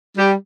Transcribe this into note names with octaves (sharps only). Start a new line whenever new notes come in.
G3 G4